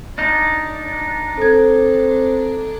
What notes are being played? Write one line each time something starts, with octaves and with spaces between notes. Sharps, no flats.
D4 D#4
C4 A4 G#6